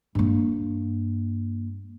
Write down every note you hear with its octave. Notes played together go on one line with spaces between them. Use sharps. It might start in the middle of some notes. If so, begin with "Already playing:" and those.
G2 A#3